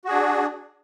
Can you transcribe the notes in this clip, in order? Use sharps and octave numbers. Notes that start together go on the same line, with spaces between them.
D4 F#4 G#4